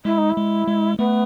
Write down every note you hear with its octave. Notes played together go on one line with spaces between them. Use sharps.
G#3 E4
D#4
E4
G#3
G#3
A3 B3